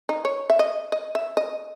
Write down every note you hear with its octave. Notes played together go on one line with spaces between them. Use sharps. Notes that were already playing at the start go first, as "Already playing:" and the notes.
D#4
C#5
E5
D#5
D#5
E5
D#5